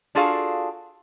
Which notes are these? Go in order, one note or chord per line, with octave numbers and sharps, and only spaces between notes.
D4 F4 F#4 G#4 A4 F5